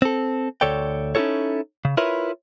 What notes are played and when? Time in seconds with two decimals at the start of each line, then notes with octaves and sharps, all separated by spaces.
0.02 C4 A4
0.61 D2 A4 C#5 D5 G5
1.15 C#4 D#4 E4 F#4 A4 C#5
1.85 C#3
1.97 E4 F4 A#4 B4 C#5 E5